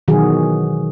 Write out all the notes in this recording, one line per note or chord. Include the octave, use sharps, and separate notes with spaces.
B2 D#3 E3 F#3 F#4 G#4